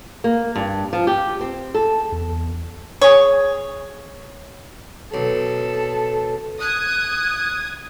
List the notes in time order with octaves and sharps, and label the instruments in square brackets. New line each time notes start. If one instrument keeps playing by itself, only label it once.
[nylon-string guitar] A#3
G2
F3
G4
C4
A4
[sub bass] E2
[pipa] G#4 C#5
[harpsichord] B1 [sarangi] A4
[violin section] D#6 G#6 [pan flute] F#6